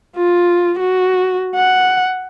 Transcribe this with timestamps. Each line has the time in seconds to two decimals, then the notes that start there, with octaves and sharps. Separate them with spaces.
0.17 F4
0.80 F#4
1.57 F#5